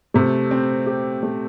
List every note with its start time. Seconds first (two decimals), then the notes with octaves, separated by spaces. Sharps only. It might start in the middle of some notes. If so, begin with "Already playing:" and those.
0.14 C3 A3
0.51 C4
0.86 G4
1.23 A3